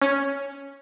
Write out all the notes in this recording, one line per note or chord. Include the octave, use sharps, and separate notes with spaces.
C#4